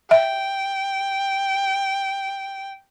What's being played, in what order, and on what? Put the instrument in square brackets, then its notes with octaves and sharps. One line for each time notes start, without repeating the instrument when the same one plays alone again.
[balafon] E5 [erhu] G5